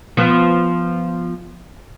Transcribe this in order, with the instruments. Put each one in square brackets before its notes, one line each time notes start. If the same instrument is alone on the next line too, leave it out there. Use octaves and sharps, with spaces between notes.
[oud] F3 B3